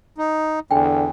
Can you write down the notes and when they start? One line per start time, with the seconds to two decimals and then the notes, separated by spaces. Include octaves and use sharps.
0.18 D#4
0.71 E2 D3 G5 G#5